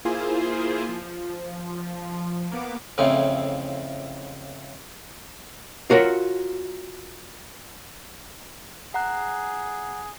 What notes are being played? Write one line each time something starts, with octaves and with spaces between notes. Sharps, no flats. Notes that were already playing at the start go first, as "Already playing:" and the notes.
A#3 E4 F4 G#4 C5
F3
A#3 B3 D6
F2 A2 C#3 E3 C4
F4 F#4 A#4 C#5
G#4 F#5 A#5 F#6